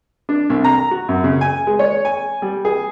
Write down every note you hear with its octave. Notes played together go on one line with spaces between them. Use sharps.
D4
C2
A#5
F#4
F#2
C#3
G#5
G#3
C#5
G#5
G3
G#4